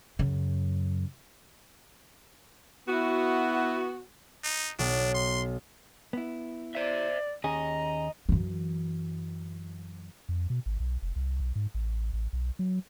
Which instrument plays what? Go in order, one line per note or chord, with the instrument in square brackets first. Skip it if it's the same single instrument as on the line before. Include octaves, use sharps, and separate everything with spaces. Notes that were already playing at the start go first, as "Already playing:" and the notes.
[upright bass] F#2 C#3
[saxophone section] B3 F#4 [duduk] E4
[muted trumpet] D#4
[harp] B1 [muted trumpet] D4
[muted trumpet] C6
[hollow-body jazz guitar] B3 E4
[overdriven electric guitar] C5 E5 [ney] D5
[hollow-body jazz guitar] D#2 C#4 G#4 [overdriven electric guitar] D#5 [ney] A#5
[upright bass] F#2 E3
[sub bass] F2
B2
G#1
B1
F1
C2
B1
G#2
A1
A1
B1
F#3